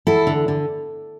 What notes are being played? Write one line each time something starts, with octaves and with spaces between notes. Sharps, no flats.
E2 E4 A4
D3
D3